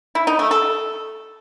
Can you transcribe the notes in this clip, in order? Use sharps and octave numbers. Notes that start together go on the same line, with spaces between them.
E4
D#4
A3
A4